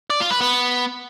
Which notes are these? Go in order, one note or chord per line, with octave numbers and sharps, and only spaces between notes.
D5
F4
B4
B3